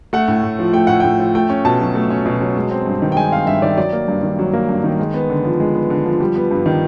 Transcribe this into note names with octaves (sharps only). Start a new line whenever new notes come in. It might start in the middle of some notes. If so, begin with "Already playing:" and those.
A3 F#5
A2
A2
F3
A3 G5
A2 F#5
A2 G5
F3
A3 G5
C#4
B2 A5
F#3
A3
C#4
B2
F#3
G#3
C4
G2
D#3
G5
G#3 G#5
C4 F5
G2 E5
D#3 D5
F#3 D5
A#3
G2
D#3
F#3
A#3
G2
D#3
G#3
B3
D3
F3
G#3
B3
D3
F3
G3
B3
G2
D#3